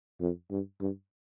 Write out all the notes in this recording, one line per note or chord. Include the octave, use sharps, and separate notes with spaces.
F2
G2
G2